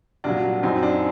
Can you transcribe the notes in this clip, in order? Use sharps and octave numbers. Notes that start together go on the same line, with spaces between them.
C2 A#2 F#3 D4 F#4
F#2 F#3 C4 D#4
D4